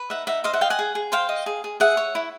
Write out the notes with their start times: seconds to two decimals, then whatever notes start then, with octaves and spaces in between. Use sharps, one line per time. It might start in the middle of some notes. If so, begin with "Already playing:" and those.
Already playing: B4
0.10 D#4 E5 F#5
0.27 D#4 E5 F#5
0.44 C5 D#5 F5
0.53 E5 F#5
0.61 D#5 F5 G5
0.70 F#5 G#5
0.79 G#4
0.95 G#4
1.12 C5 F5 G5
1.29 D#5
1.46 G#4
1.64 G#4
1.80 G#4 E5 F#5
1.97 C#5
2.15 E4